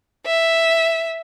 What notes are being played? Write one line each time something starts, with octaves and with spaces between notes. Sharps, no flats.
E5